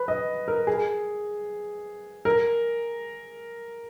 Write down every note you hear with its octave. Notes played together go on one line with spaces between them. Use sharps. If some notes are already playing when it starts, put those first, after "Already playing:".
Already playing: B4
D#5
A#4
G#4
A#4